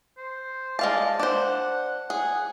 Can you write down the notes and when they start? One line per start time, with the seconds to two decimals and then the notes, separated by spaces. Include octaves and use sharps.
0.18 C5
0.79 G#3 D5 F5 A5
1.19 D4 C5 F#5
2.10 G#4 F#5